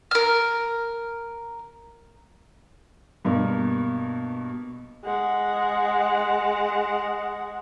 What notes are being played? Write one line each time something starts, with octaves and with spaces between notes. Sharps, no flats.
A#4 F6
G2 B2 A#3
G#3 F#5